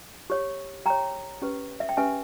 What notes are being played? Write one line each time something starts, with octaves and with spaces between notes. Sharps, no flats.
G4 C#5
G4 C#5 G5 A#5
C#4 G4 B4
E5
G5
C#4 G4 B4 E5 G#5